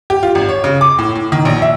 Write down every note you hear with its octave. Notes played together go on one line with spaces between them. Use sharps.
G4
F4
G#1
C#5
C#3
D6
A2
A2
D#3
A#1
E5